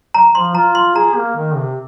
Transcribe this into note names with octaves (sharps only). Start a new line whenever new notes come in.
A#5
F3 C6
F4 A#5
C6
G#4 A#5
A#3
D#3
C3